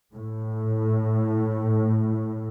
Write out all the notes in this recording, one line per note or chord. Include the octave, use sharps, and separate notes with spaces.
A2